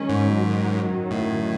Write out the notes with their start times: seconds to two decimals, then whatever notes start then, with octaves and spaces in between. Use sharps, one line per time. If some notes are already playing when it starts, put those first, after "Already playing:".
Already playing: D#3 G#3 C#4
0.09 G#2
0.34 F#2 D#3 F#3
1.11 A2